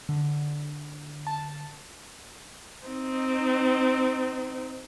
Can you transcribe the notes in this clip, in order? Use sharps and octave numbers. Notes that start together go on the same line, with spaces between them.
D3
A5
C4 D#4